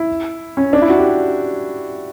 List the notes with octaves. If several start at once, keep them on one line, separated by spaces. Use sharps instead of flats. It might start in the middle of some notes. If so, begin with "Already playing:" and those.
Already playing: E4
C#4
D4
E4
F#4
G4